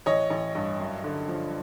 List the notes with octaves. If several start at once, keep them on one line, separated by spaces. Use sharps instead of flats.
A1 C#5 D#5
A1
G2
F#2
D3
F3